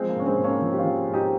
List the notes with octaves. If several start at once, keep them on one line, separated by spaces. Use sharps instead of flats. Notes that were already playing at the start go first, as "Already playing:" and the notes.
Already playing: F3 G#3 C4
A#3
G#2 C#4
G#3 C4
G#2
A#3 C#4
F3
G4
C#4 F4
F3
G#2
D#4 G4